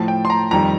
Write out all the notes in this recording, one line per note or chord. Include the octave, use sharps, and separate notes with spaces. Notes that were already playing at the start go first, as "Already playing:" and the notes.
Already playing: A2 F3 A5
G5
C6
A#5
F2 D#3 G3 A#5